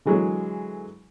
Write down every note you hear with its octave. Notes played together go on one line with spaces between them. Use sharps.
D3 E3 F#3 G#3 G#4